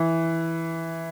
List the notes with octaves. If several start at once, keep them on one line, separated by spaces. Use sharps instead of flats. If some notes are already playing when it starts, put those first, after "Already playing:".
Already playing: E3